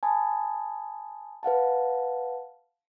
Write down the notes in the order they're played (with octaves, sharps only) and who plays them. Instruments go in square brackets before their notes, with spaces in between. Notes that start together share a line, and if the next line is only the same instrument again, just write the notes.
[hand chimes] G#5 A5 B5 D#6
B4 F5 F#5 A5